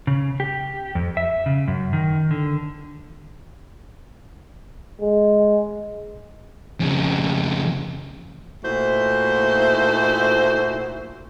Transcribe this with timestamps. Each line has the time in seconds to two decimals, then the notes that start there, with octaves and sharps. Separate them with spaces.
0.07 C#3
0.40 G4
0.95 F2
1.17 E5
1.46 C#3
1.68 F#2
1.93 D#3
2.31 D3
5.01 G#3
6.80 F2 C#3
8.63 A#2 A3 D#4 E4 F#4 C5